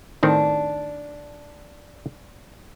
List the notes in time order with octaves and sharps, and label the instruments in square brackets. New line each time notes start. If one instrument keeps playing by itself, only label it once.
[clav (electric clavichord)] A2 D#3 C4 [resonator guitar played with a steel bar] D4